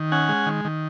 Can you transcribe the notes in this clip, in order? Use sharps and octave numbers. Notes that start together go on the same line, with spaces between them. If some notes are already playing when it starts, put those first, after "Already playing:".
Already playing: D#3
C#4 F#5 G#5
G#3
D#3
D#3